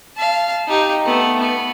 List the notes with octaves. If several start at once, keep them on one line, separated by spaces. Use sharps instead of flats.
F5 A5
D#4 G4
A3 B3
B3